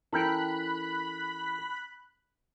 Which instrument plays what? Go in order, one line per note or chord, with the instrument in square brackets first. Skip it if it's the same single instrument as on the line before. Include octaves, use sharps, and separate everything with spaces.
[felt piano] E3 C#4 E4 [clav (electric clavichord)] A4 A#4 G5 [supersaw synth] B5 F#6